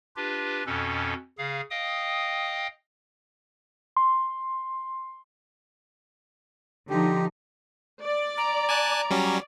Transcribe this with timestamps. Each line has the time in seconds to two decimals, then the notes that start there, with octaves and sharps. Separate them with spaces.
0.16 D4 F4 G4 B4
0.66 F2 B2 C#4 A4
1.38 C#3 G#4 F5
1.70 D#5 F5 G5 D#6
3.97 C6
6.90 D3 F3 D#4 G4
8.01 D5
8.37 A#5
8.69 G#5 A5 F#6
9.10 F#3 G3 C#4